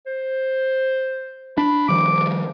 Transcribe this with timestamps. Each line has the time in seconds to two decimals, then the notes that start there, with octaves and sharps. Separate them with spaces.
0.06 C5
1.58 D4 B5
1.89 D#3 F3 G3 D6